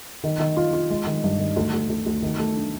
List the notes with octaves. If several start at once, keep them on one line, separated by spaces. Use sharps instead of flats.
D#3
D#3
F4
F4
G#3
D#3
G2
D#3
D2
D2
D2
D2
D#3
A3
D4